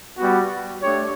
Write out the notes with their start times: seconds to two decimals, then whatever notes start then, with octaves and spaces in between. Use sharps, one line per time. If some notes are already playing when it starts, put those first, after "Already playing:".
0.18 G3 B3 F#4
0.82 A3 D4 G4 C#5